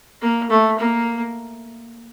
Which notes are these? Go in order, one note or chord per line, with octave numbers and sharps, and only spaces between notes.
A#3
A3
A#3